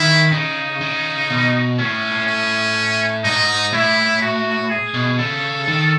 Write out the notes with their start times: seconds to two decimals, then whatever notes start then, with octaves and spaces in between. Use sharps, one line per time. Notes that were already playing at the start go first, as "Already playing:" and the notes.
Already playing: D#3 E4
0.32 C#3 D#4
0.81 C#3
1.30 B2
1.78 A2 C#4
2.27 C#4
3.24 G#2 D#4
3.73 A2 E4
4.22 F#4
4.70 G#4
4.94 B2
5.19 C#3 A4
5.68 D#3